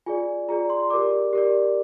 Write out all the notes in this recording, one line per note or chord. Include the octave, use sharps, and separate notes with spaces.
F4 G#4 D5 G#5
F4 G#4 D5 A#5
C6
G4 A#4 D5 D6
G4 A#4 D5